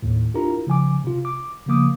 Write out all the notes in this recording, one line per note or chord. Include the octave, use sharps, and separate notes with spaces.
D#2 A2
D4 E4 F4 G4 A#4 A#5
C#3 F3 G#5 D6
C3 F4
D6
C#3 F3 A#3 D6 D#6